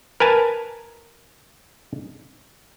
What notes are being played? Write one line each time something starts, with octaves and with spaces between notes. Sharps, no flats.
A#4 B4 G#5 A5